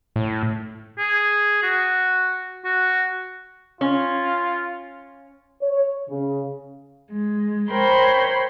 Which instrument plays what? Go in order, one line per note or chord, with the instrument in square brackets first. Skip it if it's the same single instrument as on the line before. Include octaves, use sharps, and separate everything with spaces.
[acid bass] A2
[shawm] G#4
F#4
F#4
[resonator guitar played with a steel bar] C#4 [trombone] F4
[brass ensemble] C#5
C#3
[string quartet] G#3
A#4 C5 C#5 G5 B5 C6